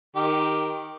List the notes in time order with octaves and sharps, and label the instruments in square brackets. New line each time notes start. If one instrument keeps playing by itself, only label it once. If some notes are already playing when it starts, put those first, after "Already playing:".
[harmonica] D#3 G4